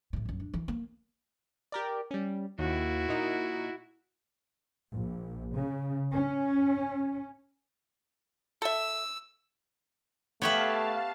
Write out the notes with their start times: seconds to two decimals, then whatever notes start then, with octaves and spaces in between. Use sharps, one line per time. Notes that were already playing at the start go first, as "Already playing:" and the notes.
0.13 C#2 A2
0.25 A#1 F#2
0.40 D4
0.54 E3
0.68 A#3
1.72 G4 A#4 D5
2.11 G3 C#4
2.59 D#2 E4 F#4
3.09 A#2 D#4
4.91 A#1
5.54 C#3
6.12 C#4
8.62 A4 E5 E6
10.42 A3 B3 G4 B4 C#5 E5 F5 A5